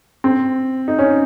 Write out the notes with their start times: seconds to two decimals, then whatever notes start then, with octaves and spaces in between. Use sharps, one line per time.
0.24 C4
0.88 D#4
0.99 C#4